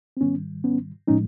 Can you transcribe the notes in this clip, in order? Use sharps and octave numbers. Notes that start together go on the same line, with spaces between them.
C4
G#2 D#3 G3 B3 C#4
B3 C#4
A2 F3 G#3 C#4 D#4